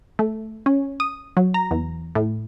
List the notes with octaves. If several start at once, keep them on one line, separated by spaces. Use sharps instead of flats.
A3
C#4
D#6
F#3
A#5
E2
A2